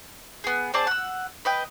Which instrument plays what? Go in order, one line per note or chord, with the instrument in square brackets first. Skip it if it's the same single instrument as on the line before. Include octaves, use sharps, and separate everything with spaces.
[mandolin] B3 G#4
C4 G#4 D5 A5
F#5 E6
B4 D#5 G5